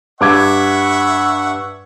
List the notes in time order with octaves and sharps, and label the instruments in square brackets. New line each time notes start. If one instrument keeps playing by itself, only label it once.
[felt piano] G2 D6 G#6 [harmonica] E5 F#5 C#6